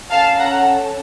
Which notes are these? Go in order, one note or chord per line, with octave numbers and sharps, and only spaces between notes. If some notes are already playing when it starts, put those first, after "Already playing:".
C#4 A4 F5 A5
F#5 A#5